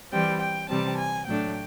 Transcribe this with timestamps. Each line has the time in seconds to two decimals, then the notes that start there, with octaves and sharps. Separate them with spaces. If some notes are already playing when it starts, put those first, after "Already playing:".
0.12 E3 G3 C4 G5
0.40 G5
0.69 C3 E3 G3 C4 A5
0.97 G#5
1.26 A2 F#3 A3 D4 G5